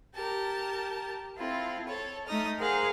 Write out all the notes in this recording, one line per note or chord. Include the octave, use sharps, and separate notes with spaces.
G4 A#4 A5
C4 E4 F4 A4
A4 C#5
A3 D#4 D#6 F6
G#4 A#4 C5 F5 F#5 G#5